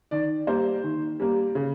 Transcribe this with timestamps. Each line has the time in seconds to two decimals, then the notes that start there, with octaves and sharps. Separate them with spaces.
0.11 D#3 D5
0.47 G3 A#3 C5
0.84 D#3
1.20 G3 A#3
1.55 C#3